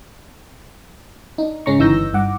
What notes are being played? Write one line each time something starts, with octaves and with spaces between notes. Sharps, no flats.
D4 D#4
G#2 C#3 C#4 A#5 C#6
G1 E3 D#4 E6 G6 A#6
G2 F#5 D6